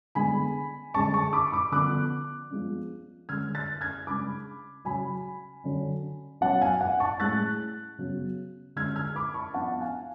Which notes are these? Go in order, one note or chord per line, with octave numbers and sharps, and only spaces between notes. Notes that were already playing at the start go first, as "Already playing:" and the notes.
D3 G#3 B3 D4 G#5 B5
D3 G#3 C#4 A5 C#6
A5 C#6
B5 D6
B5 D6
D3 F3 B3 D4 D6 F#6
F3 G#3 B3 D4
D3 G#3 C#4 F6 G#6
F#6 A6
F6 G#6
C#3 G#3 D4 B5 D6
C#3 F#3 C#4 G#5 B5
D3 F#3 C#4
B2 F#3 C#4 F#5 A5
F5 G#5
F#5
A5 C#6
A2 G#3 C#4 F#6 A6
C#3 F#3 B3
D3 G#3 C#4 F6 G#6
F6 G#6
B5 D6
A5 C#6
F3 B3 D4 F#5 A5
F5 G#5